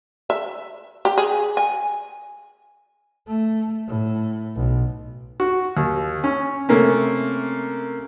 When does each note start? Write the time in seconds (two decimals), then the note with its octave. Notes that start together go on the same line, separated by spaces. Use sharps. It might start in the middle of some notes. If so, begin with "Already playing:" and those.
0.30 E5
1.05 G4
1.17 G#4
1.57 G#5
3.28 A3
3.87 A2
4.56 B1
5.40 F#4
5.77 D#2
6.24 C#4
6.69 C3 A3 A#3 C#4